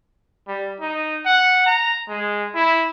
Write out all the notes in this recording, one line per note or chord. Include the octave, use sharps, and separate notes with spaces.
G3
D#4
F#5
A#5
G#3
E4